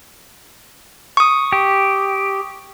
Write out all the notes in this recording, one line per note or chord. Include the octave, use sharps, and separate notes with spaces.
C#6 D#6
G4